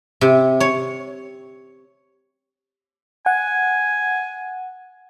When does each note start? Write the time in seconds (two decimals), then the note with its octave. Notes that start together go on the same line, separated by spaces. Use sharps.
0.21 C3
0.60 C#5
3.26 F#5 G#5